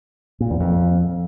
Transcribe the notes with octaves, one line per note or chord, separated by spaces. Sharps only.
A#2
E2
F2